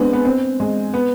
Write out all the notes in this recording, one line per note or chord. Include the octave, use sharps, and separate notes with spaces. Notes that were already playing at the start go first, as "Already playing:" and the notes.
Already playing: G#3 B3 C4 D4
B3
C4
G#3
B3